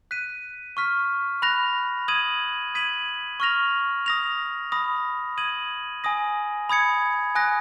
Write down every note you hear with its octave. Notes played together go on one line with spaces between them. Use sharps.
F#6 B6 D#7
C#6 F6 B6
B5 F#6 A#6 F7
D#6 G#6 D#7 F#7
D#6 G#6 B6 D#7 F#7
C#6 F6 A#6 F7
D#6 A#6 F7
B5 D#6 A#6
D#6 G#6 D#7 F#7
G#5 D#6 A#6
B5 D#6 G#6 C#7
G#5 D#6 F#6 A#6